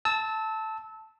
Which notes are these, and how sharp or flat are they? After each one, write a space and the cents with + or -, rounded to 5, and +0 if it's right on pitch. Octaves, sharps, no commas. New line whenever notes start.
A5 +0 E6 -25